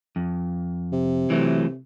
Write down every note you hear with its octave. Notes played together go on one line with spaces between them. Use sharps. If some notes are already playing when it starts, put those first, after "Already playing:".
F2
C3
E3 F#3 A3